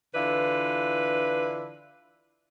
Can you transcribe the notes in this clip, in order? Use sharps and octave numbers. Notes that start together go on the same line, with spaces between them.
D3 E3 D4 E4 F4 B4